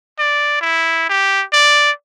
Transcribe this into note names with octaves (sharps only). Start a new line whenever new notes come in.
D5
E4
G4
D5